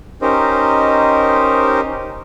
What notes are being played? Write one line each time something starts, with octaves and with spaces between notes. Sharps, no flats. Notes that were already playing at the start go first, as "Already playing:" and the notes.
C#4 D#4 G4 A#4 C5 D#5